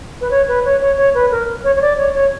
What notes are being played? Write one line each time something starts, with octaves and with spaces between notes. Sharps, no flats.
B4
C#5
B4
C#5
C#5
C#5
B4
A#4
C#5
C#5
D5
C#5
C#5